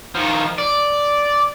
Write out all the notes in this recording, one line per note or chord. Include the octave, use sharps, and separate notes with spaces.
D#3 F3
D5